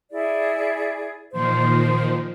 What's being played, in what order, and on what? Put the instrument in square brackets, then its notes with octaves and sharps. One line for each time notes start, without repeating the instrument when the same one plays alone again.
[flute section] E4 G#4 D5
[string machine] A#2 D#3 F3 [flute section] C5